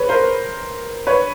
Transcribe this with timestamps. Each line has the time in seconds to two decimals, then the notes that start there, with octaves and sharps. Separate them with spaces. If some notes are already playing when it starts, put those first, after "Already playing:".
Already playing: B4 C#5
0.09 A#4 C5
1.07 B4 C#5